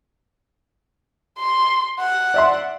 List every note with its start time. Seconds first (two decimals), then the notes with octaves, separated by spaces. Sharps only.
1.39 C6
2.00 F#5
2.34 D5 E5 C6